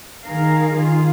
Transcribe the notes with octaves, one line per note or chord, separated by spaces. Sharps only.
D#3 G#4 A#4 F5
D#3 F4 G#4